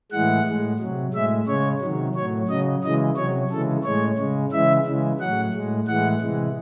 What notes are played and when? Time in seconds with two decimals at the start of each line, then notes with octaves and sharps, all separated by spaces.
0.12 A2 E3 G#3 F#5
0.47 A2 G#3
0.80 C3 F#3
1.14 A2 G#3 E5
1.47 C#3 G#3 C#5
1.81 C3 D#3 F#3
2.15 A2 F#3 C#5
2.48 C#3 F#3 D#5
2.83 C#3 E3 G#3 D#5
3.16 C3 F#3 C#5
3.50 C#3 E3 G#3 A4
3.84 A2 G#3 C#5
4.18 C#3 G#3
4.52 C#3 E3 G#3 E5
4.86 C#3 E3 G#3
5.20 A2 F#3 F#5
5.53 A2 G#3
5.87 A2 E3 G#3 F#5
6.21 C3 E3 G#3